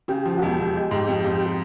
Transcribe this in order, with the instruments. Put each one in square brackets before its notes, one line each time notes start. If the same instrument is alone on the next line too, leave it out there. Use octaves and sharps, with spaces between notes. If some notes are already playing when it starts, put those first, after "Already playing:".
[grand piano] C#3 [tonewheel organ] G4
[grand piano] F3
[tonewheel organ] F#4
[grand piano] E1 [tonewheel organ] G4
[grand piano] E1
G#3
G#2
F2
F2